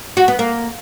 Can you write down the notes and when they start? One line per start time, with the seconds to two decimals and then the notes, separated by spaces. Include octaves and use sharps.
0.17 F#4
0.28 B3
0.39 A#3